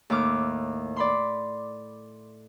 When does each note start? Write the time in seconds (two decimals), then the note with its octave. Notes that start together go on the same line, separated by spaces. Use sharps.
0.10 D#2 A2 D6 F6
0.96 D5 B5 C6